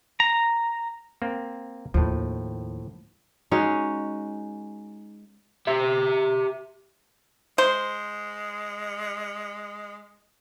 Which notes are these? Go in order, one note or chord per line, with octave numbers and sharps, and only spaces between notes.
A#5
A#3 C4
D#2 A2 F3
G#3 C#4 D#4 F#4
G4 E5
G#3 C5